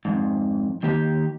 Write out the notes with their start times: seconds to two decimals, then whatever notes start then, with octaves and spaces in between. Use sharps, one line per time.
0.05 F2 G#2
0.83 D#3 A#3 G4